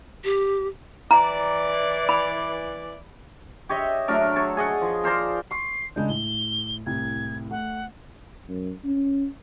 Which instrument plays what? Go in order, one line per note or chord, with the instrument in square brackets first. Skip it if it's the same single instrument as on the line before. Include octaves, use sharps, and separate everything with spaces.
[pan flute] G4
[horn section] E3 D5 [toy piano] A#5
[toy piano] B5
[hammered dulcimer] G4 C#5 D#5 E5
F#3 A3 D4 A#4
A4 C#5
G#4 D#5 F#5
F3
A#4 C5 D5 A#5
[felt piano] C6 C#6 [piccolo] C7
[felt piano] C#3 G#3 D4 [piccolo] G6
[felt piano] A2 [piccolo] G7
[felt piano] C2 A2 [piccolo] G#6
[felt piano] A3 [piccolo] F#5
[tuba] F#2
C#4